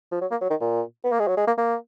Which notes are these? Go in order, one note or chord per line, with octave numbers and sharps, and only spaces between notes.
F3
F#3
A#3
F#3
D#3
A#2
B3
A#3
G#3
F#3
G#3
A#3
A#3